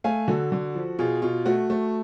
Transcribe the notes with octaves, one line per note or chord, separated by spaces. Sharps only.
A3 F5 G#5
D3 F#4 A4
D3
F3
B2 F4 G#4
B2 F4
A3 F#4
A3